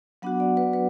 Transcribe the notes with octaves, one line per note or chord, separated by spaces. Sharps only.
F#3 B3 D4 F#4 F#5
D5
B4
B4